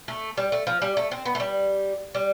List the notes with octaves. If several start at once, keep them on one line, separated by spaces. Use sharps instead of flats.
A3
G3
A3
F3
G3
A3
C4
B3
A3
G3
G3